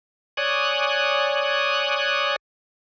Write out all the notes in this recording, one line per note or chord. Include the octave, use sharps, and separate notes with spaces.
C#5 D5 G#5 D#6 F#6